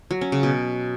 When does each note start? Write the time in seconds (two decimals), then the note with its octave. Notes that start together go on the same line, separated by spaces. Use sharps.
0.11 F#3
0.21 C#4
0.32 C#3
0.43 B2